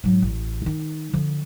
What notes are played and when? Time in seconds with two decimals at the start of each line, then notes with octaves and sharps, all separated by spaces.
0.04 G#2 F#3
0.22 A1
0.66 D#3 D#4
1.13 D3 F3